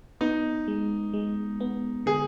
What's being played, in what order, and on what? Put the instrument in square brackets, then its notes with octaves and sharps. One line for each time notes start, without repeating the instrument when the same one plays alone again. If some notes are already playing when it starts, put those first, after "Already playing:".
[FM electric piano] B3 [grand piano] D#4
[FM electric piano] G#3
G#3
B3
[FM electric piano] D3 [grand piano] G#4